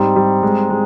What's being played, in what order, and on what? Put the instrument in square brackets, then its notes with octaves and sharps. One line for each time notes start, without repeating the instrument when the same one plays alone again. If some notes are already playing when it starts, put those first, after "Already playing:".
Already playing: [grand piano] G#2 G3 [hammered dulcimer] C4 D#4
[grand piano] G3
G#3
G#3